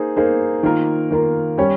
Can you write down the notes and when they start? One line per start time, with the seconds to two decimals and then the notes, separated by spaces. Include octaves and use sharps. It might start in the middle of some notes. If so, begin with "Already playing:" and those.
Already playing: A#3 D#4 G#4 C5
0.16 A#3 D#4 G#4 C5
0.63 D#3 A#3 F4 A#4
1.11 D#3 A#3 F4 A#4
1.58 G3 C#4 G4 C#5